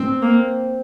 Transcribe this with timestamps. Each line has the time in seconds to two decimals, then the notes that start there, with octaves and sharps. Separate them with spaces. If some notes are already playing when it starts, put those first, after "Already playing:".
Already playing: C4
0.22 A#3